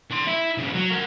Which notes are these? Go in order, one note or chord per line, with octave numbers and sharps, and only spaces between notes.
D4 C6
E4
G2 C#3
F#3
A#4 F#5